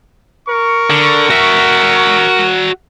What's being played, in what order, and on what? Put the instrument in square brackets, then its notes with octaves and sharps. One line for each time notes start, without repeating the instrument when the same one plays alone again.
[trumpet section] A#4 C#6
[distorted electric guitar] D3
F#4 E5